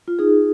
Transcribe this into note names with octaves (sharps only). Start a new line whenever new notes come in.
F4
D#4 G#4